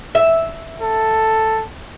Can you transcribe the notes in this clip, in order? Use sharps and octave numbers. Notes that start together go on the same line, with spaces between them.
E5
A4